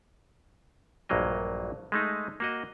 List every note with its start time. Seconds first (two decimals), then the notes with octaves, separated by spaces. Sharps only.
1.09 A#1 G2 F#3 A#3 D#5
1.92 G#3 A3 D#4
2.40 A#3 F#4 D#5